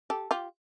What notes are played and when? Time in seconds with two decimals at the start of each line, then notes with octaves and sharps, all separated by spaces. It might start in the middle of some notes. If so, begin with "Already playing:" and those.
0.10 G4 A4
0.31 F4 G4